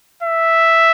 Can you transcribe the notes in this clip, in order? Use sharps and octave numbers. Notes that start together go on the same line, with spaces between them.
E5